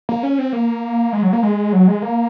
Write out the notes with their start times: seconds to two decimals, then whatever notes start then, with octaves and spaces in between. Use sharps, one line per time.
0.09 A#3
0.23 C#4
0.39 C4
0.53 A#3
1.13 G#3
1.23 F#3
1.33 A#3
1.43 G#3
1.73 F#3
1.88 G#3
2.02 A#3